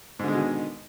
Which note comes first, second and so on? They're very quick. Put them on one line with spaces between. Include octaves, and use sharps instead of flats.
G#2 D3 G#3 B2 D#3